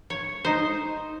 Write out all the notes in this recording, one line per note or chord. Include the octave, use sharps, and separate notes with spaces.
C#5
D#4 C5